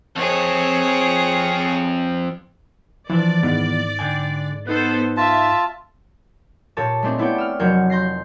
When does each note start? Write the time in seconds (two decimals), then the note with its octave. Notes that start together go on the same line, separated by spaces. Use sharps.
0.16 F2 C4 G#4 C#5
3.10 E3 F3 D4 D5
3.43 G#2 D#3 E3 B3
3.99 D3 G5 G#5
4.67 B3 D#4 A4 B4 C5
5.17 F4 E5 A5
6.77 A#2 G4 A4 C#5 A5
7.03 G#3 A3 C4 D4
7.18 B3 E4 C#5 D5 G5
7.38 E6 F6
7.59 F1 F#3 A#4 C#5 G6
7.90 C6 G6 A#6 C7